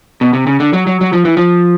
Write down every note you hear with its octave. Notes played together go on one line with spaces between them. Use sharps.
B2
C3
C#3
D3
F#3
F#3
F#3
F3
E3
F3